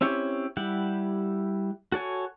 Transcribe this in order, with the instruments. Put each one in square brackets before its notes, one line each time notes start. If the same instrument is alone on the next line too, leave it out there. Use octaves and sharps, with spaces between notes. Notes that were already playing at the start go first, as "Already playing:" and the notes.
[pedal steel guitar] C4 C#4 E4 G4 C#5
G3 E4 G4 F#5
F#4 A4 C#5 G#5